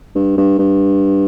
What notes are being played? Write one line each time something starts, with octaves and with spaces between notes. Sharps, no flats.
G2
G2
G2